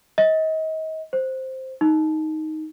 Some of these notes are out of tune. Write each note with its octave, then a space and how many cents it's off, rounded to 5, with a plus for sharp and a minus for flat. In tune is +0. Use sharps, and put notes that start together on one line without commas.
D#5 +30
C5 +0
D#4 +5